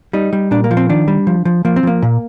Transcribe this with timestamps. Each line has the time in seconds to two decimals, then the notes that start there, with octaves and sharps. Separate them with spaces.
0.13 G3 D#4
0.33 G3
0.51 A#2 D4
0.64 A#3
0.71 F3
0.77 C4
0.89 D#3 D4
1.08 G3
1.27 F3
1.45 F3
1.65 F3 A#3
1.76 C4
1.83 F3 A#3
2.02 A#2